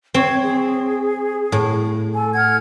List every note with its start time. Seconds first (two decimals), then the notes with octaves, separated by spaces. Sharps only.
0.14 C4 C#5 C#6 G#6
0.43 G#4
1.52 A2
2.14 A4 G#5
2.35 F#5 F6 G#6